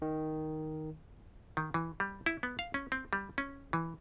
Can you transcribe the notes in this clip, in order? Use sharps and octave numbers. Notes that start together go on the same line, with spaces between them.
D#3
D#3
E3
G3
E4
B3
F5
C#4
C4
G3
C#4
E3